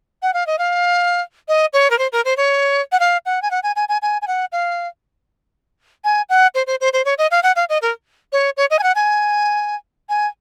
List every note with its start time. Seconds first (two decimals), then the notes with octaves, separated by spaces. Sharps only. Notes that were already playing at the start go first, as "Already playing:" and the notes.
0.22 F#5
0.34 F5
0.47 D#5
0.59 F5
1.48 D#5
1.73 C#5
1.90 A#4
1.98 C5
2.12 A#4
2.25 C5
2.37 C#5
2.92 F#5
3.00 F5
3.26 F#5
3.42 G#5
3.51 F#5
3.63 G#5
3.76 G#5
3.89 G#5
4.02 G#5
4.22 G#5
4.27 F#5
4.52 F5
6.04 G#5
6.29 F#5
6.55 C5
6.67 C5
6.81 C5
6.93 C5
7.05 C#5
7.18 D#5
7.31 F5
7.43 F#5
7.56 F5
7.69 D#5
7.82 A#4
8.32 C#5
8.57 C#5
8.70 D#5
8.79 G#5
8.83 F#5
8.95 G#5
10.09 G#5